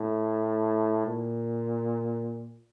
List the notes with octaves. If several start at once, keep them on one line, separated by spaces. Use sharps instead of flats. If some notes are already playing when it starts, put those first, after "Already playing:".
Already playing: A2
A#2